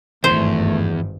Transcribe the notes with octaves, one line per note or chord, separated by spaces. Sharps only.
G#1 E2 G2 A3 C5